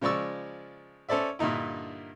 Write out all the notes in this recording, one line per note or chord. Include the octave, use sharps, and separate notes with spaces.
C#3 F3 G#3 D5 C#6 E6
C#4 A4 C5 D5 E5
G2 A#2 D3 D#4 E4